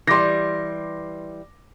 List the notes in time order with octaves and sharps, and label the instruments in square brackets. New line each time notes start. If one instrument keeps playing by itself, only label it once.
[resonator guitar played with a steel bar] E3 G3 [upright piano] C6 D6 A#6